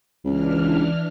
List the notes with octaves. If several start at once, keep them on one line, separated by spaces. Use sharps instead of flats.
C#2 E3 D4 F6